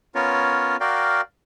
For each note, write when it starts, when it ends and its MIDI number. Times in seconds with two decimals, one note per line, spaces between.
0.15 0.76 59
0.15 0.76 61
0.15 0.76 65
0.15 0.76 70
0.15 0.76 73
0.81 1.21 66
0.81 1.21 70
0.81 1.21 74
0.81 1.21 77
0.81 1.21 79